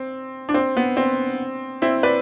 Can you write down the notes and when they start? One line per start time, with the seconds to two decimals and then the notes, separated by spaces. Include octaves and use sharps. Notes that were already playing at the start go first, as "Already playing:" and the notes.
Already playing: C4
0.49 D4
0.54 C4
0.77 B3
0.97 C4
1.82 C4 E4
2.03 B4 D5